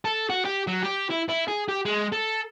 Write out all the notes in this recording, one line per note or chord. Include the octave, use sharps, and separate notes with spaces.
A4
F#4
G4
F#3
G4
E4
E4
G#4
G4
G#3
A4